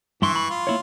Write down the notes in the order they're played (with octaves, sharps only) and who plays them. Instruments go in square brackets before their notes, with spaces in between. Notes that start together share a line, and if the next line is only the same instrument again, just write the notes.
[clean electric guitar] G2 E4 C6 [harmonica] E3 C#6
[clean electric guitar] B5
[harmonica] F4
[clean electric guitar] A#3 E4 C#5